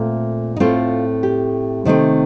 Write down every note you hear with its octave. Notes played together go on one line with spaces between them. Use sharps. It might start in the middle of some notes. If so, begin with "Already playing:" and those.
Already playing: A#2 A3 C4
D#4
A2 A3 C4 F4
G4
C3 D#3 A3 C4